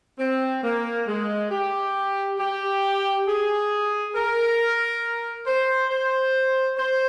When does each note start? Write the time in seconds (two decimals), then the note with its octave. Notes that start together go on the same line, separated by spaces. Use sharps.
0.19 C4
0.63 A#3
1.07 G#3
1.51 G4
2.39 G4
3.27 G#4
4.15 A#4
5.47 C5
5.90 C5
6.78 C5